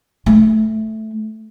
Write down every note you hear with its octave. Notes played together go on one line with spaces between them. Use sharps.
A3